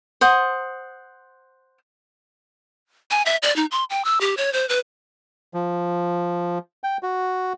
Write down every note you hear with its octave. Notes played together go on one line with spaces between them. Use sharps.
C5 F#5 D#6
G#5
E5
D5
D#4
C6
G5
E6
G4
C#5
C5
B4
F3
G5
F#4